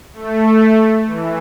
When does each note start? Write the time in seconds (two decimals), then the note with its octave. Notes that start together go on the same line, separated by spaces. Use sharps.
0.14 A3
1.07 E3